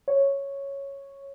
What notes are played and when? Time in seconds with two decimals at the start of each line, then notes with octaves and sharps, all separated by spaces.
0.08 C#5